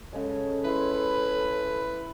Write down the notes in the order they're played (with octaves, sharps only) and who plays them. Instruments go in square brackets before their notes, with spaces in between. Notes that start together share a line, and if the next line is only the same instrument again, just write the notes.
[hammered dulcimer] C#3 G#3 [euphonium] A4 [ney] C#5
[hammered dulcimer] E4 B5 C6 [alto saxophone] B4